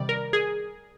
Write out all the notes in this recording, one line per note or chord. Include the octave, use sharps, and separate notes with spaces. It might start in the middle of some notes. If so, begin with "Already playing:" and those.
Already playing: C3 D#3 G3 D5
A#4
G#4